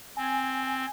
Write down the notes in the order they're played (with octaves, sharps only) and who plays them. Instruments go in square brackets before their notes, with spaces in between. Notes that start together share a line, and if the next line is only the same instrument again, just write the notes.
[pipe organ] C4 [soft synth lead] G#5